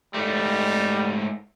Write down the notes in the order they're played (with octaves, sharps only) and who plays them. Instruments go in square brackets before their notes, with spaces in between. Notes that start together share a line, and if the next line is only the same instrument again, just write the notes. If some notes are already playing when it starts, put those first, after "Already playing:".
[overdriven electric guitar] G#2 A3 [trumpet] G3